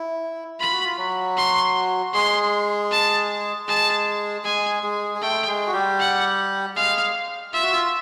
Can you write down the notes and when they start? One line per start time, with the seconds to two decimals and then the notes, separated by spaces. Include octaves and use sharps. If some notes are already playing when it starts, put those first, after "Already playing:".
Already playing: E4
0.60 F4 B5
0.72 F#4
0.84 F4
0.98 F#3 F#4
1.37 C6
2.14 G#3 G#4 C6
2.91 A5
3.67 G#3 G#4 A5
4.44 G#3 G#4 G#5
4.83 G#3 G#4
5.15 G#4
5.21 A3 A4 G5
5.48 G#3 G#4
5.67 F#4
5.73 G3 G4
5.99 F#5
6.76 G#3 G#4 F5
7.53 F4 E5
7.63 F#4
7.72 F4